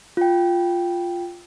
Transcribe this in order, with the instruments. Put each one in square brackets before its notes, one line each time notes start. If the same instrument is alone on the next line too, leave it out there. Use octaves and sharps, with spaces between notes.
[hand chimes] F4 G5